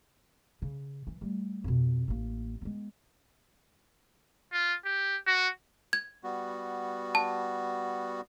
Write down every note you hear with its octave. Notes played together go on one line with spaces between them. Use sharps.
C#3
E3
G3 A3
F2 B2
A1 A#3
G#3 B3
F4
G4
F#4
G#6
G3 B3 F#4
A5